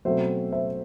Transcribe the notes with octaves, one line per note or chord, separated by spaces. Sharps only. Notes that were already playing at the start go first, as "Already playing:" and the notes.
B2 F#3 A3 C4 C5 E5
C5 E5